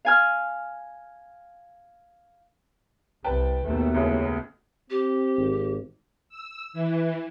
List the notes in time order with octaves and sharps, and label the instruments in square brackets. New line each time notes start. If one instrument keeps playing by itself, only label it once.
[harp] F5 G#5 F6
[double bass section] C2 [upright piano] B4 G5 A5
[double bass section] D#2 B2 A3
[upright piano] C2 A2 C#3
[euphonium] C4 [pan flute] G4
[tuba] G#1
[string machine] E6
E3